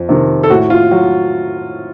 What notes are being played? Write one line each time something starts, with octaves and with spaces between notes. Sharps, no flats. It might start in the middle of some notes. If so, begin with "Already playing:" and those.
Already playing: F2
C3 D#3
A4
A2 F#4
F4
F#3 F#4